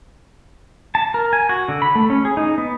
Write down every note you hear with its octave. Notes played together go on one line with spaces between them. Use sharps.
A5
A#4
G#5
F#4
D3
B5
A3
C#4
G#4
D#4
B3